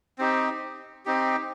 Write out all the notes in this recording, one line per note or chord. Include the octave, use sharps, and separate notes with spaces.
C4 D#4 G4
C4 D#4 G4